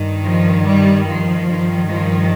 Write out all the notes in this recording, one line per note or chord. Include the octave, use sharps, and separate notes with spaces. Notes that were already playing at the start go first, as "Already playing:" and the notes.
Already playing: G2 D#3
F3
G3
F3
G2 D#3
F3